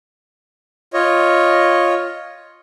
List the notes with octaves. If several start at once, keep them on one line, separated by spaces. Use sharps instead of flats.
F4 C#5 D#5